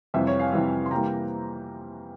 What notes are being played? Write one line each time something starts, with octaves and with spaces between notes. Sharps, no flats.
F2 C3 E3 G3 C5 E5
C#5
F5 G#5
F2 C3 E3 G3
C6
C3 E3 G3 A#3 G5 A#5